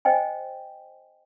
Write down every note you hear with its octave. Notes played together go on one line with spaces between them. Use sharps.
C5 D#5 G5 G#5